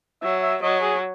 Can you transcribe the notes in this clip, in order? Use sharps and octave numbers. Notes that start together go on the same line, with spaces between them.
F#3 E5
E5
F#3 D#5
G#4